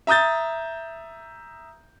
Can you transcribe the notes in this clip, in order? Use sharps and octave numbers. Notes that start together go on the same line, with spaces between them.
E5 A#5 D#6 G6 A6